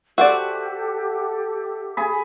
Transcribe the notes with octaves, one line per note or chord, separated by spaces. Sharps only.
F#4 G4 A4 C5 D5 E5 F#5
G#4 B5